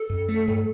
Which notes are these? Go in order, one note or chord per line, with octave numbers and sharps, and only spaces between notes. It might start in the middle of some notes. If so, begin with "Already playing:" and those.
Already playing: A4
F#2
A3
G2